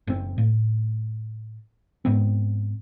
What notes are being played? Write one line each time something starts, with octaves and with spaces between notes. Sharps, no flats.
F#1 C4
A2
G#2 B3 C4